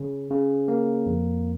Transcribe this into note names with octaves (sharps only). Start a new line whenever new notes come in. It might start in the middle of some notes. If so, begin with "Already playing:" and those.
Already playing: C#3
C#3
A#3
F2